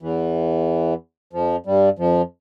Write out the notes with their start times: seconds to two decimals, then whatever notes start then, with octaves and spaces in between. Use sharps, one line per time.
0.02 E2 E3
1.33 F2 F3
1.66 G2 G3
1.99 F2 F3